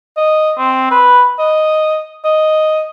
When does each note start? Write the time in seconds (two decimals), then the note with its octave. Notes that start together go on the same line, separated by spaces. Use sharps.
0.17 D#5
0.58 C4
0.91 B4
1.39 D#5
2.25 D#5